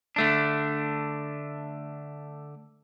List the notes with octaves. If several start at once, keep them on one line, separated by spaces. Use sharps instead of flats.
D3 A3 D4